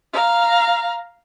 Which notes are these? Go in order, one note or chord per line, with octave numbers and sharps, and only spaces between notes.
F5 A#5